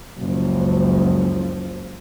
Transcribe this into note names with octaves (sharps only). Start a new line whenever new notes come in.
F#1 C#2 F3